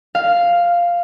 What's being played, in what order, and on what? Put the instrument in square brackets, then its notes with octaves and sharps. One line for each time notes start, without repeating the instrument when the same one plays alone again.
[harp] F5